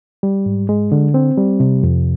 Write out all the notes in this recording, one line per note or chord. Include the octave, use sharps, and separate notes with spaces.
G3
G#2
G#3
D3
C4
G3
C3
F2